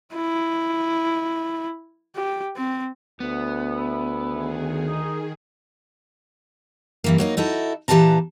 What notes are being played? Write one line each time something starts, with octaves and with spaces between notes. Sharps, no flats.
E4
G4
C4
D2 B3
E4
D#3 G#4
D#4
G2 E3 A#3
F#3 A#3 D#4
D#4 E4 F#4 A4
A#2 E3 G4 B4 A5 A#5